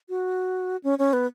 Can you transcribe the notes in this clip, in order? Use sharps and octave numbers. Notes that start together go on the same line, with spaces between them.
F#4
C#4
C#4
B3